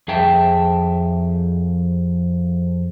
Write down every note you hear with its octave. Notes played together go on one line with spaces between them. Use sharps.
F2 G#4 E5 G5 A5